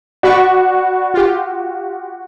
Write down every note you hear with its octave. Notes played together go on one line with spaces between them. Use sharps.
F#4 D5 B5 C#6
F4 G4